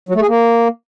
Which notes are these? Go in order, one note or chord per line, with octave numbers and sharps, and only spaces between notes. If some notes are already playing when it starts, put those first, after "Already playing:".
F#3
A3
G#4
A#3